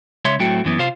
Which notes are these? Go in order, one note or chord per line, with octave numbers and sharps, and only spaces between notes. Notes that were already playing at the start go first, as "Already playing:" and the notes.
C#2 C#5 E5 C6
A2 F#3 A3 C4 F#4 G5
F#2 E3 B3
C3 F4 C5 F5